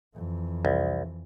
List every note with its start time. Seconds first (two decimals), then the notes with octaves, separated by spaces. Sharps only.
0.15 F2 E3
0.65 C2